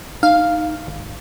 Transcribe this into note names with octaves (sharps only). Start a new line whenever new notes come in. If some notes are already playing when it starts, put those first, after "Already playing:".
D#4 F5
G#1